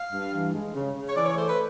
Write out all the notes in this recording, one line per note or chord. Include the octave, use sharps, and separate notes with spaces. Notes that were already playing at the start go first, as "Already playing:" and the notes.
Already playing: F5
G2
E3
G#3
C#3
C#3
C#5
E3 D5
C#5
A3 C5
B4